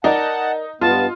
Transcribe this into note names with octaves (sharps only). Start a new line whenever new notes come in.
D#4 A#4 D5 F#5 A5
G2 B3 F4 D#5 A5